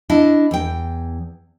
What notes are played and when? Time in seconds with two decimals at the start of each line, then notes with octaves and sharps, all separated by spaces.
0.09 D4 E4 D#5
0.51 E2 G5